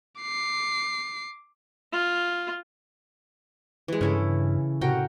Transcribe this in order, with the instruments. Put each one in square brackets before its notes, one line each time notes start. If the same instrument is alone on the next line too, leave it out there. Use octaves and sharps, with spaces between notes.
[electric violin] D6 C7
[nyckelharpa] F4
[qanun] E3 G#3
[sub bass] G2 [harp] C#3 [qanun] C#4 E4 A4
[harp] A2 [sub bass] C3 [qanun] F#4 A#4 G5